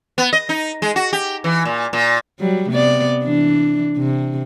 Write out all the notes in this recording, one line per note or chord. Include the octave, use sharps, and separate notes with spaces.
B3
D#5
D#4
G#3
F#4
G4
E3
A#2
A#2
F#3 G3
C3 B3 D5
E3 D4
C3